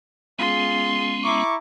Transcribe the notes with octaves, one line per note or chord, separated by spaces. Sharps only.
G#3 B3 C#4 F4 G#4 C6
E4 A#5 C#6 D6